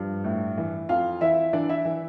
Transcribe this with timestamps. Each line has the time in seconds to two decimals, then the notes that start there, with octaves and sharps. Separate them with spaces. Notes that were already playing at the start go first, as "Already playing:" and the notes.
Already playing: G2 F3
0.24 A2
0.57 E3
0.89 F2 F4 F5
1.21 E3 E4 E5
1.53 E3 D4 D5
1.69 E4 E5
1.85 E3